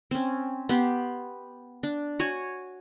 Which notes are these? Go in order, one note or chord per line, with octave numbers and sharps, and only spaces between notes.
C4 C#4
B3 G4 C6
D4
F#4 C#5 G#5 C#6